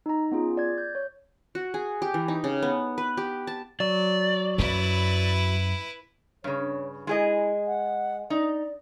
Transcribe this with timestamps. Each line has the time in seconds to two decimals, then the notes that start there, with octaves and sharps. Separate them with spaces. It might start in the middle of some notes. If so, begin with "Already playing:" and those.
0.06 D#4 A#5
0.31 B3 C#4 F4 G#4
0.57 D5 G#6
0.78 G6
0.95 C#5
1.55 F#4
1.74 G#4
2.02 G4
2.14 E3
2.28 D#4
2.44 C#3
2.62 B3
2.98 B4
3.17 G4
3.47 A5
3.80 F#3 D5
4.58 F#2 E4 B4
6.44 G2 C#3 C#5
7.07 G#3 E4 G#4 D#5
7.67 F#5
8.30 D#4 D5